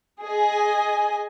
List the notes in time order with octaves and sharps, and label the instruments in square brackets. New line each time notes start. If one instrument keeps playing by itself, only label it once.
[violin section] G#4 D#5 G#5